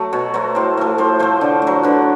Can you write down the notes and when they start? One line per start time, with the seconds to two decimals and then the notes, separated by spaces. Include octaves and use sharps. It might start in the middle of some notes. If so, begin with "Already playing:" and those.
Already playing: F#3 A3
0.13 B2 C#5
0.34 F#3 A3 C5
0.55 A2 C5
0.77 F3 A3
0.98 A2 C5
1.19 F3 A3 C5
1.41 D3
1.62 A3
1.67 F#3
1.83 D3 B4